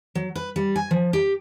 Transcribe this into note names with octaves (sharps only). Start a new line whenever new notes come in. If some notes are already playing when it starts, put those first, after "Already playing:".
F#3
B4
G3
G#5
F3
G4